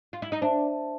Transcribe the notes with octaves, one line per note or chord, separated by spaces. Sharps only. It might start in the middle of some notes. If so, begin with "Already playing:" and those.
F4
E4
D#4
D4 C5 E5 A5